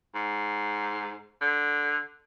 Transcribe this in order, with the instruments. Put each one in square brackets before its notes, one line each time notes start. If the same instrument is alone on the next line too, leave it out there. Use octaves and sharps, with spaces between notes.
[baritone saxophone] G#2
D3